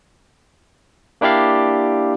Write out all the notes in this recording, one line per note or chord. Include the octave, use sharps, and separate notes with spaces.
A#3 D4 E4 G4 D5 F5